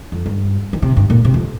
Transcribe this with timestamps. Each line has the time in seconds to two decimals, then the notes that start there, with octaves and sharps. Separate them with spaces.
0.12 F2
0.26 G2
0.73 D#3
0.82 C3
0.97 G2
1.10 A#2
1.25 C3
1.34 F2